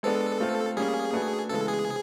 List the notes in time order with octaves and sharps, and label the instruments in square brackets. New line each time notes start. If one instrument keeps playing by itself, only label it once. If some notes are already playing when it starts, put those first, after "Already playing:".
[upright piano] G#3 B3 D4 [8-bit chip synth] A4
[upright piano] A3 C4 F4
[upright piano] G3 A#3 C#4 [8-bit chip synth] G#4
[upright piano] A3 D4 F#4 B4
[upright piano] C#3 E3 G#3 B3 [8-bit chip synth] A4
[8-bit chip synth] G#4
[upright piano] C3